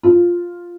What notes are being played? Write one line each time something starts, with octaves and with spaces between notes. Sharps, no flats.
F4